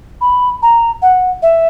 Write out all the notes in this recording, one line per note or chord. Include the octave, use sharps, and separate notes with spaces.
B5
A#5
F#5
E5